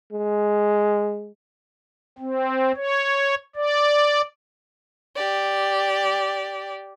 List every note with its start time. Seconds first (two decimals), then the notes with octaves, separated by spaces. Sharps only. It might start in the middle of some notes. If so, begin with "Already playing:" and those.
0.12 G#3
2.18 C4
2.76 C#5
3.56 D5
5.16 G4 D5